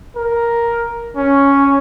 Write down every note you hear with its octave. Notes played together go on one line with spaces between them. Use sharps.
A#4
C#4